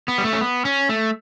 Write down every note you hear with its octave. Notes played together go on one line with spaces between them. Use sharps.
B3
G3
A3
C#4
B3
C#4
A3